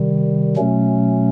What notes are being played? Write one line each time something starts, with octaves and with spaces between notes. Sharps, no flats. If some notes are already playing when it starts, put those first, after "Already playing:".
Already playing: C3 D#3 G3
B2 F#3 A3 C#4